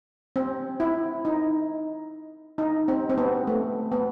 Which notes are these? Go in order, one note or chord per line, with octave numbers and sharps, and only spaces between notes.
C4
E4
D#4
D#4
C4
C4
B3
A3
B3